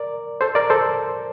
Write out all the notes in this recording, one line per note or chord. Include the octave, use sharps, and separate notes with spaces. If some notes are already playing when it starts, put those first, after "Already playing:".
Already playing: A#4 D5
A4 C5
A#4 D5
A4 C5